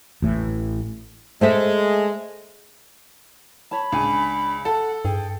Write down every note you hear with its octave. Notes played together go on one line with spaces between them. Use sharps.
A1 A2 E3
G#3 A3 C5 E5
C#5 A5 B5
C#2 D4 G#5
A4 F#5 A5
G2 G#4 G5